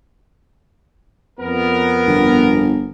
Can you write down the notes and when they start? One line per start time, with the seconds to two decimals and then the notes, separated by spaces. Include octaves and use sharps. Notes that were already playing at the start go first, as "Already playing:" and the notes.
1.40 F2 B3 A#4
2.07 G1